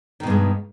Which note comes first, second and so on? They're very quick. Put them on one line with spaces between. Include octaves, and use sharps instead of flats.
D#3 B2 G2 G#3